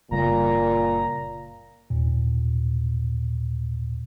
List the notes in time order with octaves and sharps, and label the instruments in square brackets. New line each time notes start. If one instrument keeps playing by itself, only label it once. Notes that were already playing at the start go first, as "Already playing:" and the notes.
[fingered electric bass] F#1 C#3 G3 [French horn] A#2 [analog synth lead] A#5
[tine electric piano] D#2 A#2